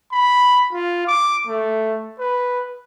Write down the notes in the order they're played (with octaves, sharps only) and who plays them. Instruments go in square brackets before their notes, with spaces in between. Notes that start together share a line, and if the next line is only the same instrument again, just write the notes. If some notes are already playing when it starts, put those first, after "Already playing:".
[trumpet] B5
F4
D6
A3
B4